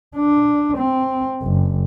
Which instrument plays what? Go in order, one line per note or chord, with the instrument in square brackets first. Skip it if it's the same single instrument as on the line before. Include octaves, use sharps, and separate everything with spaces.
[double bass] D4
C4
F#1